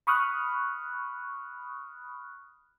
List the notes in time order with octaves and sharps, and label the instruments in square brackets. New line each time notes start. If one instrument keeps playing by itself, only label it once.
[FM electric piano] B5 C#6 D#6 F6 F#6